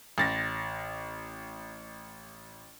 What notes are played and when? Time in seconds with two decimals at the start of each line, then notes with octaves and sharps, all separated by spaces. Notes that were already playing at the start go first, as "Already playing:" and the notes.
0.18 A1 A6 A#6